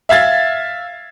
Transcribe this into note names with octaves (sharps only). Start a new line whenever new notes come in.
E5 F5 G#6 A6